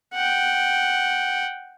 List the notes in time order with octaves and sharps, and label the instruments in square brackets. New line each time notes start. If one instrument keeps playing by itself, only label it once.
[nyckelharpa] F#5 G5